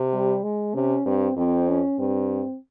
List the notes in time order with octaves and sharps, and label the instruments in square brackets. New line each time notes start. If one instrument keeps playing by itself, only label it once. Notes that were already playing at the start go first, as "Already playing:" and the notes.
Already playing: [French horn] C3
[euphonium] G3
G#3
[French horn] C3 [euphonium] C#4
[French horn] G2 [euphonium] C4
[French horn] F2 [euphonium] C4
[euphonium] C#4
[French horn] G2 [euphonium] C4